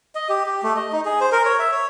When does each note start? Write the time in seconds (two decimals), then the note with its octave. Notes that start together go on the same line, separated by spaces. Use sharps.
0.15 D#5
0.29 G4
0.46 G4
0.63 A3
0.76 D#5
0.92 D#4
1.05 G#4
1.21 C5
1.32 A#4
1.45 C#5
1.59 E5
1.72 C#5